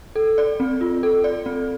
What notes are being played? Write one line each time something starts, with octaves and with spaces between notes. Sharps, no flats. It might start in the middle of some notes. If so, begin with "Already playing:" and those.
A4
D5
C4
F4
A4
D5
C4